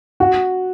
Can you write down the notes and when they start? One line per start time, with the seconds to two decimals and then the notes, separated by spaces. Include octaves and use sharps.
0.20 F#4